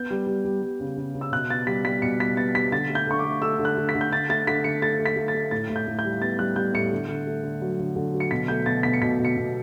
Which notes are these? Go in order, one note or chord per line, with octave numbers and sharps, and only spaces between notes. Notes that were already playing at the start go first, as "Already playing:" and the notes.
Already playing: B3 G6
G3
G3
G3
G3
C#3
C#3
C#3
E6
B2 F#6
B3 A6
G3 B6
G3 B6
B2 C#7
G3 B6
B3 A6
G3 B6
D3 A6
A3
G6
D3 C#6
D6
A3
A3 E6
D3
F#6
D3
B6
D3
G6
D3 A6
A3 A6
D3 B6
D3 C#7
A3 A6
A3
B6
A3
A6
A3
A2 A6
A2
G6
A2
G6
G3
B3 A6
G3 F#6
G3 G6
A2 C#7
D3
D3
A3
D3
F#3
D3
D3
F#3
C#7
B2 B6
A3 G6
B2 A6
B2 B6
C#7
B2 B6
B2
C#7
B2